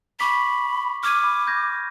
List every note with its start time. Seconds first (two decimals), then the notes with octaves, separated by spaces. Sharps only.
0.20 B5 C#6 D6 B6
1.03 D6 F6 G#6 D#7
1.24 B5
1.47 G6 G#6 A#6